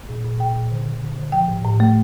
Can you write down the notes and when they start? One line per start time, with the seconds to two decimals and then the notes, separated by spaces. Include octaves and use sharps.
0.09 A#2
0.24 A#2
0.39 A#2 G5
0.55 A#2
0.71 D3
0.86 D3
1.01 D3
1.17 D3
1.32 F3 G5
1.48 A2
1.64 A2
1.80 A3